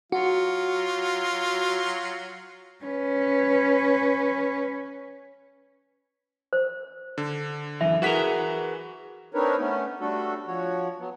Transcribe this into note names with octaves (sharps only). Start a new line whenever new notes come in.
F#3 F4 F#4
C#4 B4
C5
D3
F#2 E3 E5
E3 F#4 G#4 A#4 F#5 B6
C4 D4 D#4 A#4 B4 C#5
A3 B3 C#4
G3 A3 D4 F#4 A4
F3 F#4 C#5
F#3 B3